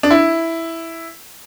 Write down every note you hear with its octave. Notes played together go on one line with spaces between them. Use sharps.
D4
E4